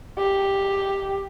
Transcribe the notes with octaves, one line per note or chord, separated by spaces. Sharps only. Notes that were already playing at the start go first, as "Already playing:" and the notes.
G4